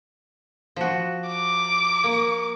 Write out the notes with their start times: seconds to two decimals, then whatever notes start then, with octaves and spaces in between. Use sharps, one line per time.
0.76 F3 F#4
1.28 D6
2.04 A#3